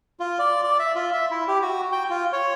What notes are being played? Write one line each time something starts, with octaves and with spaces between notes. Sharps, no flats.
F4
D5
D5
E5
F4
E5
E4
G4
F#4
G5
F4
C#5